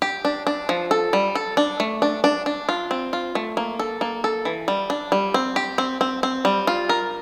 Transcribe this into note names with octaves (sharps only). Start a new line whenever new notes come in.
G4
D4
D4
F3
A4
G3
A4
D4
A3
D4
D4
D4
F4
C4
F4
A3
A#3
A4
A#3
A4
E3
G3
D4
G3
C4
G4
C4
C4
C4
G3
F4
A#4